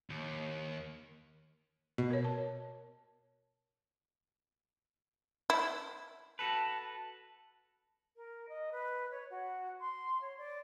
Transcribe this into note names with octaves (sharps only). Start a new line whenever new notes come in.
D#2
B2
A#4 C#5
A5
E4
F#4 A4 B4 A5
A#4
D#5
B4
C#5
F#4
C6
C#5
D5